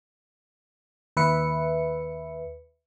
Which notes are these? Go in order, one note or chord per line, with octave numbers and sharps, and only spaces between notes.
D#2 B4 E5 C#7